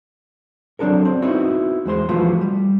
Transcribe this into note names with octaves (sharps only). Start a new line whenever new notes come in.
F#3 C4 D4 A4 A#4
C4
B3 C4 D#4 E4 F#4
E2 G#3 C5 C6
E3 F3 A3 B3 F4 F#4
G3